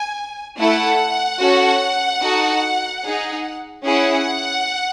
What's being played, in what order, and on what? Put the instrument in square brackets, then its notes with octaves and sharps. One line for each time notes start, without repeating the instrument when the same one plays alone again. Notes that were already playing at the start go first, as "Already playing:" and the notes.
Already playing: [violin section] G#5
A3 E4 A4 F#5
C#4 F#4 A4
D#4 F#4 A4
D#4 G#4
C#4 E4 G#4 F#5